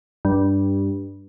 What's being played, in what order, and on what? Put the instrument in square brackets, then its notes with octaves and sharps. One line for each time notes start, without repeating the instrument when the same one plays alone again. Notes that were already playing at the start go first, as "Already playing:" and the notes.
[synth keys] G2